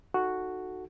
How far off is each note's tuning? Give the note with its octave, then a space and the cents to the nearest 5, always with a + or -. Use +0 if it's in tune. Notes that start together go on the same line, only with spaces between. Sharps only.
D#4 +0 F#4 +0 A4 +0